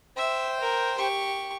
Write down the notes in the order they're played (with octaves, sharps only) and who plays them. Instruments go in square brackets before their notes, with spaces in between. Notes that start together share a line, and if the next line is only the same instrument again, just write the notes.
[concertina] C5 G5 [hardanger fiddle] E5
[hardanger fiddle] A#4
G4 C#6